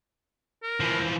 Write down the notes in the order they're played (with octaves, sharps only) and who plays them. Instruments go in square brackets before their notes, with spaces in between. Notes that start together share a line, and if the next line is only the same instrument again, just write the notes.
[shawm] A#4
[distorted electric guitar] E3 F3